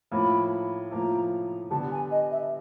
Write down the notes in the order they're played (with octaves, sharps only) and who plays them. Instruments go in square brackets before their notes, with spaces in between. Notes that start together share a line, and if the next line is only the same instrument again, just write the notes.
[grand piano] A2 F3 A#3 [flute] B5
[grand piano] A2 F3 A#3 [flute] A#5
[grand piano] D3 G3 B3 [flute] A5
[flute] G#5
D#5
E5